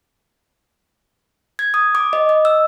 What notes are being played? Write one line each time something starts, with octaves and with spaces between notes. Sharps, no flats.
G#6
D#6
D6
D#5
D#5
E6